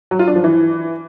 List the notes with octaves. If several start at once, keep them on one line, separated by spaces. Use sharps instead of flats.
F#3
F4
D4
F3
E3